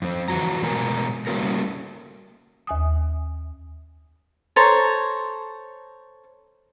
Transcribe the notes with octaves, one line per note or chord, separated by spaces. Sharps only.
F2 C4
E3 F4 F#4 A#5
B2 G#3 A#4 G#5
G3 A3 A#3 C#4 F#4 A#4
D#2 G#5 D#6
A4 C5 C#5 A#5